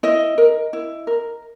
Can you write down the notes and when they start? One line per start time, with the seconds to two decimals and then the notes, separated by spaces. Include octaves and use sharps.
0.03 E4 D#5
0.38 A#4
0.73 E4
1.07 A#4